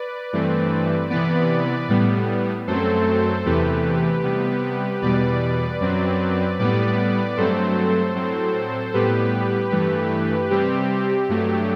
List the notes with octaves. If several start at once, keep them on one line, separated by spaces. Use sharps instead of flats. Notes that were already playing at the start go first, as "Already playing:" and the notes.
Already playing: B4 D5
G2 E3 A3 C4
C3 E3 B3 B4 D5
A2 G3 B3
F#2 F#3 A3 C4 A4 C5
E2 C3 E3 A3 G4 B4
C3 G3 B3
E2 B2 G3 B4 D5
F#2 F#3 C4
A2 G3 B3 B4 D5
G2 F#3 A3 C4 A4 C5
A2 F#3 C4
A2 G3 B3 G4 B4
G2 E3 A3
C3 G3 C4 G4
G2 F#3 A3